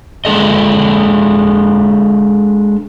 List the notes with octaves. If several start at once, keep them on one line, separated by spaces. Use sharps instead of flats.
G#3 D4 A4 D#5